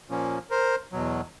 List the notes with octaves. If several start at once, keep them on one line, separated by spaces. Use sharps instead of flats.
A#2 F3 A#3 C#4
A#4 C5
E2 B2 F#3